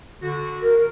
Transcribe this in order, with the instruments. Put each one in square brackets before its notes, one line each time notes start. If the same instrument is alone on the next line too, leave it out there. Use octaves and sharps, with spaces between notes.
[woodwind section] D3 F#4
[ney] A#4